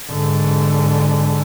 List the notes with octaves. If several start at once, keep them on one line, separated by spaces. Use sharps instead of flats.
G#2 D3